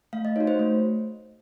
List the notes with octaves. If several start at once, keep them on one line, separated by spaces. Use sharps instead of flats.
A3 F5
D#5
D#4 F#4 C#5
C5
A3